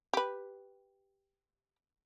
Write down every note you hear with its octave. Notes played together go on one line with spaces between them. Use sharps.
G4 B4